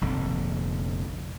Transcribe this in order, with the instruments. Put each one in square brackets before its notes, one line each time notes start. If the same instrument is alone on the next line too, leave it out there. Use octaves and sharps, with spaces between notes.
[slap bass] F1 A#1 F2 D3